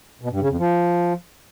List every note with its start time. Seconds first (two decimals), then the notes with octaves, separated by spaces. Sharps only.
0.22 B2
0.31 G2
0.40 C#3
0.49 F2
0.59 F3